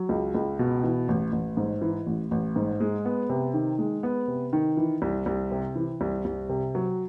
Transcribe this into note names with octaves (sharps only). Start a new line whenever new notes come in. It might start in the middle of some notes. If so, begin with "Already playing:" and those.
Already playing: F#3
C#2
C#2
B2
E3
A1
A1
G#2
E3
A1
A1
G#2
G#3
B3
C3
D#3
G#3
B3
C3
D#3
E3
C2
C2
C3
E3
C2
C2
C3
F#3